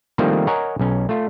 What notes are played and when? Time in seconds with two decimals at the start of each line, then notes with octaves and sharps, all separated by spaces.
0.18 D#3 F3 G3 A3 A#3 C4
0.47 A#4 C#5 D#5 F#5 G#5 A#5
0.79 B1 C#4
1.09 A3 F4